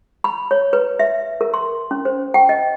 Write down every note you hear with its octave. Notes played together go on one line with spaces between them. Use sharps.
B5
C#5
B4
E5
A#4
C6
C#4
C5
G5
D#5